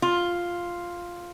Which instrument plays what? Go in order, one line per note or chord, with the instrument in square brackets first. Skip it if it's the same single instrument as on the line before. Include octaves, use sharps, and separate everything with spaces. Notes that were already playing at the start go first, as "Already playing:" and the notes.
[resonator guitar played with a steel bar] F4